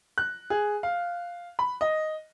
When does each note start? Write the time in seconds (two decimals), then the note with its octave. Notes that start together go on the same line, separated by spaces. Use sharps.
0.18 F#6
0.50 G#4
0.83 F5
1.59 B5
1.81 D#5